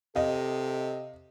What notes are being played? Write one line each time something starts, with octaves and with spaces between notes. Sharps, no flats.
C3 A4 D#5 F5